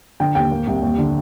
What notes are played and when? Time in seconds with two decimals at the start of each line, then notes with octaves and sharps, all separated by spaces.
0.20 D3 G5
0.35 D#2 G5
0.51 A#3
0.67 C2
0.82 D#2
0.98 D3